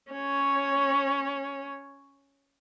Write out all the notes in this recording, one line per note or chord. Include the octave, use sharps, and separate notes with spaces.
C#4 C#5